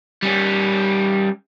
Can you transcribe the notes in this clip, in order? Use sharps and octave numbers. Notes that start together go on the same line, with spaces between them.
G3 C#4